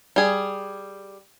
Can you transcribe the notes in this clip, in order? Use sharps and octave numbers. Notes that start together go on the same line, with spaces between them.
G3 G#4